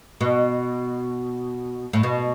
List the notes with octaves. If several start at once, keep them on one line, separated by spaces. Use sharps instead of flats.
B2
A2
B2